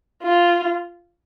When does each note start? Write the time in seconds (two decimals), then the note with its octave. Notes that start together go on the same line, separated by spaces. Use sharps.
0.23 F4